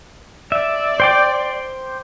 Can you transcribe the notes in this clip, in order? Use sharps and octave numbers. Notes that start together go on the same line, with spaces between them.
D5 E5
C5 G5 D6